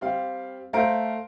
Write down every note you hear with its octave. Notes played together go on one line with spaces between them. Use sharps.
G3 C4 F5
A3 C5 F5 A#5 D7